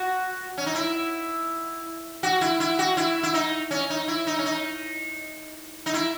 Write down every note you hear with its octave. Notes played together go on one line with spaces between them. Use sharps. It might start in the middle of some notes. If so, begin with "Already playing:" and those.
Already playing: F#4
C#4
D#4
E4
F#4
E4
E4
F#4
E4
E4
D#4
C#4
D#4
E4
D#4
C#4
D#4
D#4
E4